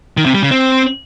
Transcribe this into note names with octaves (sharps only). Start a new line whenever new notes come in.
D#3
C3
G3
C#3
C4